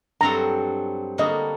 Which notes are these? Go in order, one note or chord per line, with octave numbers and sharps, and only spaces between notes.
G2 F#3 C4 F#4 A4 A#5
D3 G3 A#3 F#4 D#5